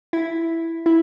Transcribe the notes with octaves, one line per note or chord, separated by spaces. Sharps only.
E4
E4